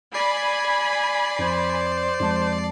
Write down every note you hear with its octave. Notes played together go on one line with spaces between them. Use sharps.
D5 G#5 B5 C7
F2 C5
F2 G#3 A5